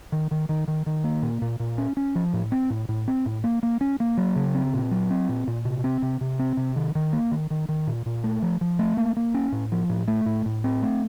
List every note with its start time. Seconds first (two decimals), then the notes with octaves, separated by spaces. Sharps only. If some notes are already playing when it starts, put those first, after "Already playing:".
0.12 D#3
0.31 D#3
0.49 D#3
0.68 D#3
0.86 D#3
1.04 A#3
1.22 A#2
1.41 A#2
1.60 A#2
1.78 C#4
1.97 C#4
2.15 F3
2.33 A2
2.52 C4
2.70 A2
2.89 A2
3.08 C4
3.26 A2
3.44 A#3
3.63 A#3
3.81 C#4
4.00 A#3
4.17 F#3
4.36 C#3
4.55 C4
4.74 A#2
4.91 F#3
5.10 C4
5.29 A#2
5.47 A#2
5.65 C3
5.84 C4
6.02 C3
6.21 C3
6.39 C4
6.57 C3
6.76 D#3
6.95 D#3
7.13 A#3
7.31 D#3
7.50 D#3
7.69 D#3
7.87 A#2
8.06 A#2
8.24 A3
8.42 F3
8.61 F3
8.79 A3
8.97 A#3
9.16 A#3
9.34 C#4
9.52 A2
9.72 F3
9.89 A2
10.08 A3
10.26 A2
10.46 A2
10.64 C4
10.82 A3